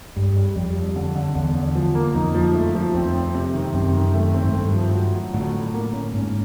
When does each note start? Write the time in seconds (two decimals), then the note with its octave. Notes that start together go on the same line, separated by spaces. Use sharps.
0.16 G2 G3
0.36 G3
0.56 F2 G3
0.75 G3
0.96 D3
1.16 D3
1.35 E2 D3
1.55 D3
1.75 F3
1.95 A#3
2.15 F2 D#4
2.35 F3
2.55 A3
2.75 F3
2.94 F2 C4
3.15 C4
3.35 C3
3.54 D#3
3.74 F#2 C3
3.94 D#3
4.14 A3
4.34 C4
4.44 G#2
4.53 G2 A3
4.74 F3
4.94 F#3
5.14 F#3
5.33 A2 D3
5.53 D3
5.73 A#3
5.93 C#4
6.13 G#2 C#4